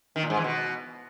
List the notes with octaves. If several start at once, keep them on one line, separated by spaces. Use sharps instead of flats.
D#3
A#2
G#2
E3
B2